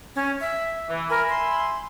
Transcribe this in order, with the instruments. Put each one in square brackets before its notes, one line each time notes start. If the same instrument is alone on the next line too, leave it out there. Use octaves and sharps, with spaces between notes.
[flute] C#4
E5
[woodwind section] E3
[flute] A#4 [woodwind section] E5 G#5 B5
[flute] C6